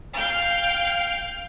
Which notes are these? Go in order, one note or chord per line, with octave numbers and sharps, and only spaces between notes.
F5 G5 F6